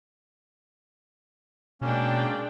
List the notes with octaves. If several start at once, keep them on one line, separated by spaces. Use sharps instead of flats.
B2 G#3 A#3 C#4 D4 G5